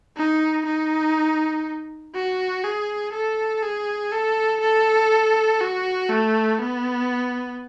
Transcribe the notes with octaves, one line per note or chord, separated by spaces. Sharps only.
D#4
D#4
F#4
G#4
A4
G#4
A4
A4
F#4
A3
B3